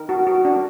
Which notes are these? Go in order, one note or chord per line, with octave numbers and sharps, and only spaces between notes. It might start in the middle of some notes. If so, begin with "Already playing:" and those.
Already playing: D#3 A#4
F#4
F#4
D4